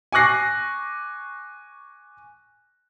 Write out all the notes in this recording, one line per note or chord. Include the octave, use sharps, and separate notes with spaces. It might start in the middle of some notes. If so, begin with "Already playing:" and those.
G#5 C#6 D6 F#6 A#6 C7